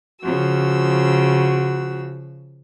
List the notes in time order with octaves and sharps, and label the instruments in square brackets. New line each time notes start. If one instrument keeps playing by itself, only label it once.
[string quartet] C#3 F3 E6 [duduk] F#4